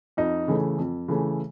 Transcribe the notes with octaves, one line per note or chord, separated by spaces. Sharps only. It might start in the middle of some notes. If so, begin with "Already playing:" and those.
F2 D#4
C#3 E3 A3
F2
C#3 E3 A3